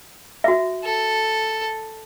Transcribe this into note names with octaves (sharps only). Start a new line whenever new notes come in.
F#4 E5
A4